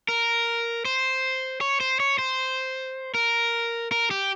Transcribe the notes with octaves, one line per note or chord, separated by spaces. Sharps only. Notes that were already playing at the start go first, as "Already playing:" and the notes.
A#4
C5
C#5
C5
C#5
C5
A#4
A#4
G4